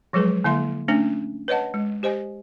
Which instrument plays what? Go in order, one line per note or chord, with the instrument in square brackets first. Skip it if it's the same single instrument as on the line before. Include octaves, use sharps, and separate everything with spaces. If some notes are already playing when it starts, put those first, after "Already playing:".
[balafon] F3 F#3 G#3 G#4 B4
D3 A#3 E4 E5 C6
A3 C#4 D4
B4 C#5 D#5 F#5 A5
G#3
G4 C5 D#5 G#5